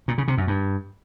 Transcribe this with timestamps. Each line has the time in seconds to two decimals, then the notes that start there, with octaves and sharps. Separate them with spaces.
0.08 A#2
0.18 C#3
0.28 C3
0.38 F#2
0.47 G2